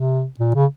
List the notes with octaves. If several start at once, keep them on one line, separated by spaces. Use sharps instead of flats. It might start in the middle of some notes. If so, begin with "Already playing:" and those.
Already playing: C3
A#2
C#3